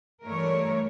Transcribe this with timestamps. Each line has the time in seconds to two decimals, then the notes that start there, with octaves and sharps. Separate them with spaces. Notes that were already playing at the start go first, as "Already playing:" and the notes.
0.24 G2 E3 A3 A#4 C#5